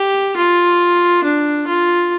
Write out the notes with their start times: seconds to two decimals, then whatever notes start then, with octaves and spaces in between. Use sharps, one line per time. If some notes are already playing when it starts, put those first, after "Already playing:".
Already playing: G4
0.36 F4
1.24 D4
1.67 F4